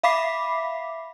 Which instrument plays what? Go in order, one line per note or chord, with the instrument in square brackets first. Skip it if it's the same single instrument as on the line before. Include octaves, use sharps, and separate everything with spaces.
[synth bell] E5 F5 B5 D6 B6 C7